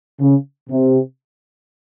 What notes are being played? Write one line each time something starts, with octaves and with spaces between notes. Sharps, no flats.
C#3
C3